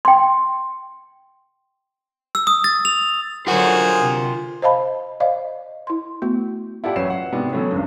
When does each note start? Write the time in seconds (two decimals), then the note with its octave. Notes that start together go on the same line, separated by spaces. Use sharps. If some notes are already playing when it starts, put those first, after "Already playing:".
0.05 G5 C6
2.35 E6
2.47 D#6
2.64 A6
2.85 F7
3.47 D3 F#3 F4 G#4 A#4 C5 F#5
4.01 C3
4.62 C5 D#5 F5 A5 B5
5.20 C5 D5 D#5 F5
5.87 E4 C6
6.22 A3 B3 F#4
6.84 E4 F4 G4 D5 F#5 A5
6.96 A1 F#3 C#4 B4 C7 E7
7.10 F#5
7.32 G#2 C3 B3 D4 D#4 F#4
7.52 D3 E3 F#3 A3 B3 C#4
7.72 G#1 C#2 G2